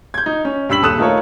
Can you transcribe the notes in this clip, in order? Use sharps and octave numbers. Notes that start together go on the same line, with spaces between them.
G6 G#6
D#4
C#4
G2 B5 E6 B6 F#7
D#1 A4 D#6 F#6 E7
A3 D#4 F4 A4 A#4 C#5